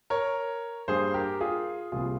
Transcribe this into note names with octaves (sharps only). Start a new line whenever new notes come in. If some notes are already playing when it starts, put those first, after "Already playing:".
A#4 C#5
G2 G3 A#3 G#4 C5
G4 A#4
F4 G#4
C2 A#2 G3 C4 F4 G#4